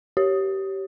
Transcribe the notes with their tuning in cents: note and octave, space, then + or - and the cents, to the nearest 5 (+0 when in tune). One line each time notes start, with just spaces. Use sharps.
G4 -20 C#5 -5